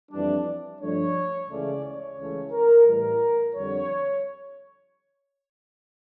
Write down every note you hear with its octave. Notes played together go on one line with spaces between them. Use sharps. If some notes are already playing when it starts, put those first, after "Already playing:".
F2 E3 G3 D4
G2 F3 A3 D4 C#5
C#2 C#3 E3 A3 C#4 D5
C#5
C#2 C#3 E3 A3 C#4
A#4
A2 E3 G3 A#4
F2 D3 G3 C#5